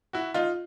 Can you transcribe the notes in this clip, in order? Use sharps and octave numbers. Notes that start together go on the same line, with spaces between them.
E4 F#4
D#4 F4